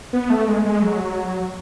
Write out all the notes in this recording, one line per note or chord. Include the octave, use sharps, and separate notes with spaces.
B3
A3
G#3
G#3
F#3